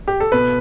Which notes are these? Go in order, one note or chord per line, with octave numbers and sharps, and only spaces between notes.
G4
A4
B2 B4